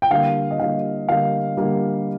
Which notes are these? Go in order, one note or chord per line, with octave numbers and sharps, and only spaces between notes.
G5
D3 G3 A#3 F5
D#5
D3 G3 A#3 F5
D3 G3 A#3 F5
D3 G3 A#3